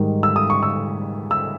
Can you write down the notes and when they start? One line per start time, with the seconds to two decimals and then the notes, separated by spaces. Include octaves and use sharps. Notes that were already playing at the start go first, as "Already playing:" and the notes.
Already playing: G#2 D#3 G3
0.23 E6
0.36 D#6
0.50 C#6
0.63 E6
1.31 E6